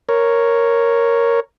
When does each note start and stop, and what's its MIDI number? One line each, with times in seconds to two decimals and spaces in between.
0.09 1.40 70
0.09 1.40 73